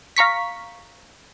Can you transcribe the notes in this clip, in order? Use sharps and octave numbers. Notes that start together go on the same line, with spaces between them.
F5 A#5 C#6 B6